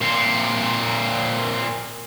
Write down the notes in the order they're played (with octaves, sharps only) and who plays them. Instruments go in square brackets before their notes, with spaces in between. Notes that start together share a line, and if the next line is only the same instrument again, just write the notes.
[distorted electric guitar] A#2 C4